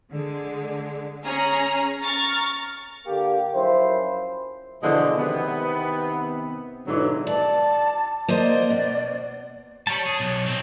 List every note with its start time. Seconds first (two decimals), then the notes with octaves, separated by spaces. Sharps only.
0.11 D3 G#3
1.24 C#4 G#4 G#5 A#5
2.04 A#5 C#6 F6 A6
3.06 D3 A#3 G4
3.54 F#2 F3 E4 C5
4.82 B2 D3 E3 F3 G#3
5.17 C3 D#3 B3
6.87 G#2 B2 D3 E3 F#3
7.27 D5 A5
8.28 A#3 C5 D5 D#5
8.70 B2
9.87 G3 C#5 A5
10.06 G#4
10.20 B1
10.46 C4 D#4